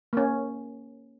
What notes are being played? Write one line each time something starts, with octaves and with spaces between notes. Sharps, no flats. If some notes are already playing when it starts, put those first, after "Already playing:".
A#3 C#4